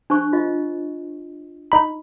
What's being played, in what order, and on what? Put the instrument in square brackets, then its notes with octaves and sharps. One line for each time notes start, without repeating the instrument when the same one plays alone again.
[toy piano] D4 C5 C#6
F4 D#5
[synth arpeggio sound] D#4 B5